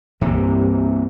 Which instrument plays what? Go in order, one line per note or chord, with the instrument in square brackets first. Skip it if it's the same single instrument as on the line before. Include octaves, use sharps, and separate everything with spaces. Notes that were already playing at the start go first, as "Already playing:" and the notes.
[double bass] C2 G2 [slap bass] C3 E3 A#3